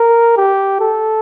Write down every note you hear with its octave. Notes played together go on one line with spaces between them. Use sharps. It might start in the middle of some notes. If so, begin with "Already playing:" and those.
Already playing: A#4
G4
A4